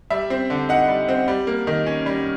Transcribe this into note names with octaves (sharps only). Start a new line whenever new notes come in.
G3 E5
C4
D3
D#4 F#5
G3
C4
G3
A#3
D#3
C#4
G3